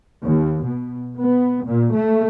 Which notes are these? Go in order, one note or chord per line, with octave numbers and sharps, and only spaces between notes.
D#2
B2
B3
A#2
A3